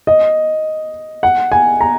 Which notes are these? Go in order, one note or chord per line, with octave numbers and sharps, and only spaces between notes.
D#5
F#5
G#5
A#5